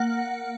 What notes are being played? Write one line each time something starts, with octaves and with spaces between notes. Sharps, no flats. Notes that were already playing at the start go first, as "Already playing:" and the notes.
Already playing: A#3 F#5